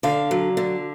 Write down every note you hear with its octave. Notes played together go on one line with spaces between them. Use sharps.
D3 F5
F#3
D3